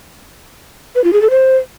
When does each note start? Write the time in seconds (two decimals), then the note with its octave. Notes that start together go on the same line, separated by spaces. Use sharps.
0.95 B4
1.04 F4
1.13 G#4
1.22 A4
1.30 C5